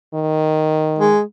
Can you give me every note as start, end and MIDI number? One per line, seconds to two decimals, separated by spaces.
0.14 1.13 51
0.99 1.21 56